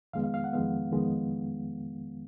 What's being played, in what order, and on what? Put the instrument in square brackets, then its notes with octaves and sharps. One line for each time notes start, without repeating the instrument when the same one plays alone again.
[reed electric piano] F2 D#3 G#3 B3 F5
F5
F5
F#5
F2 D#3 G#3 B3 F5
F2 D#3 G#3 B3